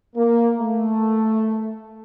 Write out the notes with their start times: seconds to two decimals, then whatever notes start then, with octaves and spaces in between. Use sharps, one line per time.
0.16 A#3
0.57 A3